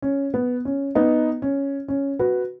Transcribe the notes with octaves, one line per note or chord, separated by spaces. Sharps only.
C#4
B3
C#4
B3 D#4
C#4
C#4
F#4 B4